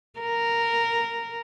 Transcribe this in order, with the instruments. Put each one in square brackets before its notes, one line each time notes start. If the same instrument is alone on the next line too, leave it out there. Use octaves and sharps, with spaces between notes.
[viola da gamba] A#4